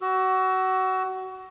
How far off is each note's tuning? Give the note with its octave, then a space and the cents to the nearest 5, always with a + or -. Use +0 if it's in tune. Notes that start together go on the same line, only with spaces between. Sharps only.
F#4 +25 E6 +0